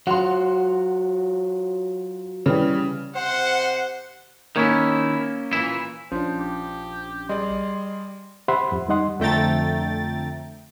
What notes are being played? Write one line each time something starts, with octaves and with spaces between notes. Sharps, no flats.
F#3 F4 F#5 C6
C#3 E3 G3
C3 C5 F#5
D#3 A#3 C#4 E4
A#2 E3 E4
A#1 F3 C#4 D4 C5
G4
G3 G#4 D5 D#5 C6
G4 C5 E5 F#5 B5 C6
F2
G3 D#4 D#5 F#5 C6
F2 D3 A3 G5 A#5 A6